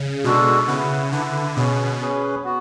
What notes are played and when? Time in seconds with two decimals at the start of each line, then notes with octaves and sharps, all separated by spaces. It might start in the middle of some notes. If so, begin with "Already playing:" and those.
Already playing: C#3
0.24 B2 G#3 D4 F#4 A4
0.68 C#3 E4 B4 F#5
1.12 D3 E4 B4 F#5
1.56 B2 C#4 G#4 B4
2.00 C#4 G#4 B4
2.44 B3 F#4